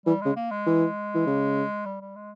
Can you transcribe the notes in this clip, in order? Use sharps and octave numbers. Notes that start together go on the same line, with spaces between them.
E3 G3
C#3 G#3
A#3
G#3
E3
E3
C#3
G3
G3
G#3